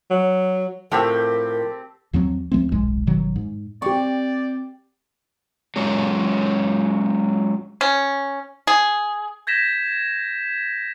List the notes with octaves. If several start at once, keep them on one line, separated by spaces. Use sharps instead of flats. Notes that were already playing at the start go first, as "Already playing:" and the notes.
F#3
A2 F3 C4 G4 A4 A#4
D#2 F3 F#3 C4
C#2 F3 A3 C4
D#1 B1 G#2 G#3
G1 B2 D#3 F#3
G#2
C4 G4 D5 C#6
F#3 G#3 C#4 F4 G4
C#4
G#4
G6 G#6 A#6 B6 E7